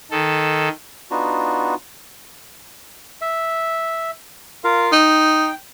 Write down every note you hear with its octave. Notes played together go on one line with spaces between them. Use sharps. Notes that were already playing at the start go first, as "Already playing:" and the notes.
D#3 A4
B3 D4 D#4 F4 F#4
E5
F4 A#4 F5
D#4 G5